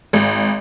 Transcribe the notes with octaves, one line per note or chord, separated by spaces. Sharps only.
G#1